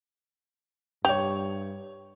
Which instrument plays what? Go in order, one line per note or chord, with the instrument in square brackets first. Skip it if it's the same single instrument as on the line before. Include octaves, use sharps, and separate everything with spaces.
[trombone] G2 [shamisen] G4 [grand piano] C#5 F7